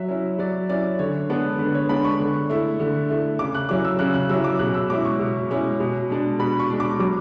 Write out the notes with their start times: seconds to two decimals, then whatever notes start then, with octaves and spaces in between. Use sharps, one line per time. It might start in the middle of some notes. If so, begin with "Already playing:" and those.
Already playing: F#3 E5
0.09 C#4 E4
0.39 F#3 D5
0.69 C#4 E4 D5
0.99 D3 C#5
1.29 G#3 B3 D4
1.59 D3 B4
1.74 C#5
1.89 G#3 B3 D4 B5
2.04 C#6
2.19 D3
2.50 A3 E4
2.80 D3
3.09 A3 E4
3.39 C#3 D6
3.55 F#6
3.69 F#3 C#4 E4 D6
3.85 E6
3.99 C#3 F#6
4.14 F#6
4.29 F#3 C#4 E4 E6
4.44 D6
4.59 B2 F#6
4.74 E6
4.90 G#3 C#4 E4 D6
5.05 C#6
5.19 B2
5.50 G#3 C#4 E4
5.80 B2
6.10 G#3 D4
6.39 B2 B5
6.59 C#6
6.70 G#3 D4
6.80 D6
6.99 F#3 D6